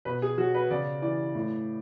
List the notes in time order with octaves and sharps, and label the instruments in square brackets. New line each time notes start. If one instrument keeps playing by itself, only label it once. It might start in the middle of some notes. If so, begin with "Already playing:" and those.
[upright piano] B2 B4
G#4
F#3 F#4
B4
C#3 D5
E3 D5
A2